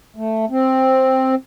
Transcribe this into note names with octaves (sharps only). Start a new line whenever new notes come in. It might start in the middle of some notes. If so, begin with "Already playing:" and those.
A3
C4